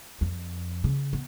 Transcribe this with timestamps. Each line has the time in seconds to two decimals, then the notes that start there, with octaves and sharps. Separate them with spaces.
0.21 F2
0.84 C#3
1.13 B3